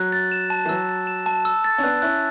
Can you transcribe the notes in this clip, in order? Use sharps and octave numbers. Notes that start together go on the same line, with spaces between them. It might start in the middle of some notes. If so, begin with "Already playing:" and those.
Already playing: F#3 F#6
A6
E7
A5
E3
F#3 E6
A6
E7
A5
E6
A6
C#4
B3 D4 F#6
C#4 E4 F#6